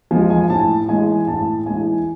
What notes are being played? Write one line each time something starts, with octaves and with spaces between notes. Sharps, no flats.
F3 G#3 G#5
G#5
A2 A5
E3 G#3 G#5
A2 A5
E3 G#3 G#5